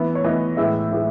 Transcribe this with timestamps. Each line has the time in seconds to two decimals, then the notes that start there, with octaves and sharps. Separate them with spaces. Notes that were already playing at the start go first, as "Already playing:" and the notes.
Already playing: E3 B3
0.15 C#5
0.24 E3 B3 D#5
0.57 A2 E3 G#3 E5
0.91 A2 E3 G#3